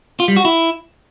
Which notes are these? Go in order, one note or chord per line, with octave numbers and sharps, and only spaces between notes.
F4
G3
F#4
E4